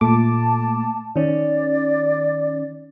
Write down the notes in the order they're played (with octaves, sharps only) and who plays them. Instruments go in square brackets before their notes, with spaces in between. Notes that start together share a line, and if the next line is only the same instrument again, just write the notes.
[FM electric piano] A#2 A3 D6 [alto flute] A5
[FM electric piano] D#3 C#4 [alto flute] D5